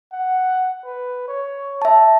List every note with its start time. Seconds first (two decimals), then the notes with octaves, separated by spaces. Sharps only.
0.13 F#5
0.85 B4
1.28 C#5
1.82 E5 A5